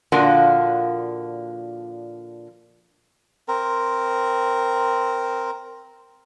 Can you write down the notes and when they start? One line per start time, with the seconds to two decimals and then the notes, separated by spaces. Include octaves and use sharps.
0.12 A#2 D3 F3 A#3 D4 F#4
3.48 C4 A#4